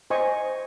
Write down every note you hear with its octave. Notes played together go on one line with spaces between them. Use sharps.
C5 D#5 G#5 C#6